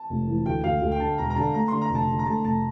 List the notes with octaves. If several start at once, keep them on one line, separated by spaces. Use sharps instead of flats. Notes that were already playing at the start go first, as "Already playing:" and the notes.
Already playing: A5
F1
E3
D2 G5
D2 F5
D2
G5
D3 A5
E1 A#5
A#5
D3 A5
A3 A#5
D3 C6
A#5
F1
A5
D3
A#5
A3 A5
F1 A5